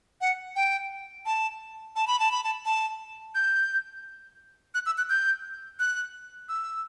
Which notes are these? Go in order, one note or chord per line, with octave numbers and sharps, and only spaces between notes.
F#5
G5
A5
A5
B5
A5
B5
A5
A5
G6
F#6
E6
F#6
G6
F#6
E6